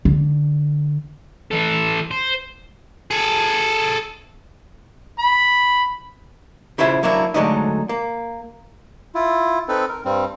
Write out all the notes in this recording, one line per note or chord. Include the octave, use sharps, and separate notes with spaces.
D3
E3 A4
C5
G#4 A4
B5
C#3 E4 F4 C5 E5 A5
F#3 A#3 D4 E4
D3 F#3 G#3 A3 D4 D#4
A#3
E4 F4
C4 D#4 A4 B4
A#4
G2 G3 C4